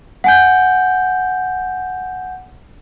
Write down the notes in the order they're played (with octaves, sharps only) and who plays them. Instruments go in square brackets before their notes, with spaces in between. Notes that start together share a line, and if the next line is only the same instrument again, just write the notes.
[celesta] F#5 G#5 G6